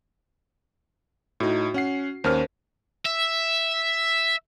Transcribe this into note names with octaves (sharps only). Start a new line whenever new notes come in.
A2 D#4 F#4
C#4 F#5 C7
D#2 C#4 A#4 C5 F6
E5